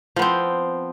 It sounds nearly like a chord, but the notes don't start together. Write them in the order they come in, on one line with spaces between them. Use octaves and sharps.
F3 B3 C4